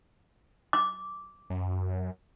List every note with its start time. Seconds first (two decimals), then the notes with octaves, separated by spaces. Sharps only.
0.73 D6
1.50 F#2